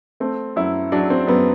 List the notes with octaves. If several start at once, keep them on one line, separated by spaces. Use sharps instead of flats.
A3 C4
F#2 E4
F#3 D4
C4
F#2 B3